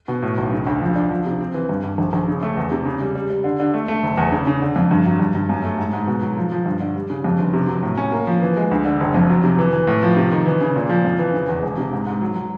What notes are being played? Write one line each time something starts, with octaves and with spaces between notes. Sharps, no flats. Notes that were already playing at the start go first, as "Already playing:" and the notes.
B2
A2
B1
C#3
D2
F3
D4
F3
C3
C4
E3
G2
G2
A#1
A#1
C#3
A3
E2
C3
C#3
G3
G3
G3
D3
D3
A3
A3
F#1
E2
C#3
C#3
D3
F2
G2
F#3
G2
G2
F#2
A3
G#2
G#2
B2
F#3
F3
F3
G2
D3
G3
C#3
F2
G1
C3
F#3
A2
C#4
A#3
F3
E3
G#3
D2
D3
F#1
F2
F#3
C3
E3
E3
A2
F3
C3
D#3
E3
C#3
A#2
F3
F2
E3
C#3
E2
E1
C3
G#2
G#2
F#3
F#3